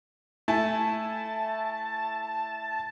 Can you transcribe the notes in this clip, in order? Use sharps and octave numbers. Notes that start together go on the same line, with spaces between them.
A3 E4 G#5 A5